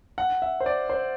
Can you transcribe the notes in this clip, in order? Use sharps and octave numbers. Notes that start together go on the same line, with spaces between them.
F#5
E5
C5
D5
C5